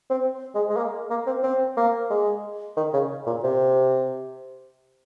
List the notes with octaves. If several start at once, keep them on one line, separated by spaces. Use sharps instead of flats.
C4
G#3
G#3
A#3
A#3
C4
C4
A#3
G#3
D#3
C#3
A#2
C3